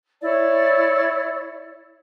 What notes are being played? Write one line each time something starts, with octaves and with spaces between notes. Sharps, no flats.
E4 C#5 D5